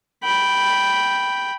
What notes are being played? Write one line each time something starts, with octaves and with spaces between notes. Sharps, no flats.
G5 B5